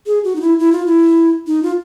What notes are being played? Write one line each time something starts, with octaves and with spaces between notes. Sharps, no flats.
G#4
F#4
D#4
E4
E4
F4
E4
D#4
F4